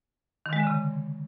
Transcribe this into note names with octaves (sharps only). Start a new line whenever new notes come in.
D#3
G#3
D3
C#3